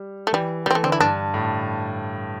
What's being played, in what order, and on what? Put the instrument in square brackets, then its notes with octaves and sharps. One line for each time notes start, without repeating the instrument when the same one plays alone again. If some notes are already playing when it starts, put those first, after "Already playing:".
Already playing: [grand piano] G3
[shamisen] A3
[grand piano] E3 [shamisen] G3
[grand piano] E3 [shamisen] G3 C4
[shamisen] A3
[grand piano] D3 [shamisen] C4
[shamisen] E4
[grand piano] G2 [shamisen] D4
[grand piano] A2